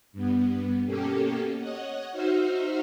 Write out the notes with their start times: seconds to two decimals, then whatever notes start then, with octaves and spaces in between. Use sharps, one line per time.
0.12 G2 B3
0.85 B2 A#3 C#4 G4 A4
1.57 C#5 D#5 F#5
2.12 D#4 F#4 C5 E5 F6